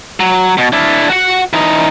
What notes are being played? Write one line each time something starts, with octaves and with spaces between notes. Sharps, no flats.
F#3
B2
D4 E4
F#4 F#5
E3 D#4